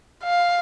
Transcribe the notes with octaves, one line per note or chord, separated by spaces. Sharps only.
F5